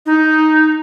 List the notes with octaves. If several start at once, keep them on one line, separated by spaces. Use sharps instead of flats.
D#4